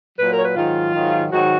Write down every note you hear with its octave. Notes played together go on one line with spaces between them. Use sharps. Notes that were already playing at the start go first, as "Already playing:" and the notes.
A#2 F#3 B4
A#4
C#5
B4
G#2 D#3 F#3 F4
G#2 D#3 F#3
G#2 D#3 F#3 F#4